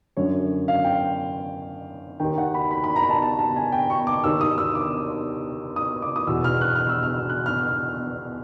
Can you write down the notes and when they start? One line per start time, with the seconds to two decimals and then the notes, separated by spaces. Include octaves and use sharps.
0.17 F#2 D3 C#5
0.68 F5
0.85 G5
2.20 D#2 D#3 G5
2.38 F#5
2.54 B5
2.71 B5
2.84 B5
2.96 A#5
3.09 A5
3.22 A5
3.39 A5
3.56 G#5
3.72 G5
3.90 C#6
4.07 D6
4.24 D#2 D#3 E6
4.41 D#6
4.58 E6
4.75 D6
5.76 D#6
6.02 D6
6.16 D#6
6.27 E2 B2 E6
6.44 F6
6.61 F#6
6.75 F6
6.89 E6
7.03 F6
7.30 F#6
7.46 F6